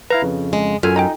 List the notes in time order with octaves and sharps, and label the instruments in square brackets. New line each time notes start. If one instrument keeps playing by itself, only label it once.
[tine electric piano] E4 F5 A#5 [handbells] B4
[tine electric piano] F2 C#3
[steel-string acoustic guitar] G#3
[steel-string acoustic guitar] F#2 [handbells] F4 A4 [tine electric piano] G#5 F6
[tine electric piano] D#4 [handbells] G5 G#5 A#5